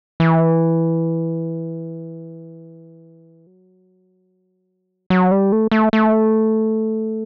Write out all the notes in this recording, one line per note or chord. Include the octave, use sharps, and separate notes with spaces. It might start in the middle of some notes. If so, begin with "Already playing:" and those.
E3
F#3
F#3
G3
A3
A3
A3